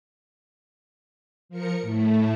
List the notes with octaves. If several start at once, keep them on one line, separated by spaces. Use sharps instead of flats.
F3 A#4 C#7
A2 A3